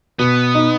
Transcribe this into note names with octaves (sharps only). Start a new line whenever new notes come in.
B2 B3
D#4